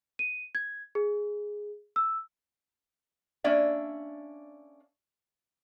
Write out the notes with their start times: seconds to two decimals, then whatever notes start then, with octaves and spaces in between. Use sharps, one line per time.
0.19 D#7
0.55 G#6
0.95 G#4
1.96 E6
3.44 A#3 C#4 D4 D5 E5